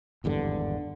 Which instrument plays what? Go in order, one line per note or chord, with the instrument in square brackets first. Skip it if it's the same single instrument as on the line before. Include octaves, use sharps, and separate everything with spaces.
[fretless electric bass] G#1 E2 G2 D3